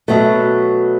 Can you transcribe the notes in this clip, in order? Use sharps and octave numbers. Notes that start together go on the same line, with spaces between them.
B2 F#3 A3